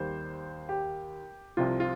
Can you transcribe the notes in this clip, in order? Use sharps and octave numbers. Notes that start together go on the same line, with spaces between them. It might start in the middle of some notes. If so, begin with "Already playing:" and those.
Already playing: D#2 D#3 G3 C5
G4
C2 C3 F3 F4
F4